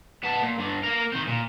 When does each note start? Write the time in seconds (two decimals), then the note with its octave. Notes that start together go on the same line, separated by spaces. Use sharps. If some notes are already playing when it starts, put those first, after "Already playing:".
0.24 B3 A5
0.42 A#2
0.59 G2 D3
0.84 A#3 A#4
1.12 D#3 C4
1.28 A#2